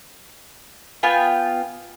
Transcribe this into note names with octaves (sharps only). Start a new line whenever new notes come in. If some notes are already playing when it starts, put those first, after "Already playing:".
B3 F4 G5 G#5